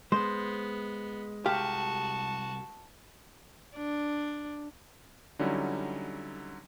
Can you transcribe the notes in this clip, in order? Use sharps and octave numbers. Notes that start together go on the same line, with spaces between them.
G#3 B3 C5
C2 F#4 G4 F5 A5
D4
D3 F#3 G3 C#4 D#4 E4